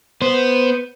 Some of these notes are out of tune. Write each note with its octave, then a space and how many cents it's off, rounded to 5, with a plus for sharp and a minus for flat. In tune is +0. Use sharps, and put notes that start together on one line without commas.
B3 +0 C5 -5